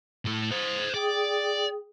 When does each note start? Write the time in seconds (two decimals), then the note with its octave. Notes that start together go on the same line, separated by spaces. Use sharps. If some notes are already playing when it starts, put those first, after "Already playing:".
0.25 A2 A4
0.51 C5 D#5
0.94 G#4 D5 G5 D#6